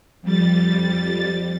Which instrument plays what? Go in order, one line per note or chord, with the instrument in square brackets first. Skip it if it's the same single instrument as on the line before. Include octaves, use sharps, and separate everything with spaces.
[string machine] F2 G3 A6